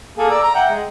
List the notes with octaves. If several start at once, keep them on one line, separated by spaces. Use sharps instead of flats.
A#3 G#4 A4
D5 A#5 E6
A#5
E5 F#5 G5
G#3